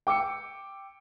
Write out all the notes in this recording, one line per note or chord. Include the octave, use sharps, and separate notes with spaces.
G5 D6 E6 C#7